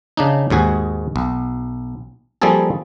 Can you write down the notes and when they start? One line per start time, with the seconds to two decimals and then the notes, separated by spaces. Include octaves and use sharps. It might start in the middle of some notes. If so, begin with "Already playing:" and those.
0.17 C#3 D4 D#4
0.50 D#2 G#2 F#4 G#4
1.16 B1
2.42 F3 G3 A#3 C4 G#4 A4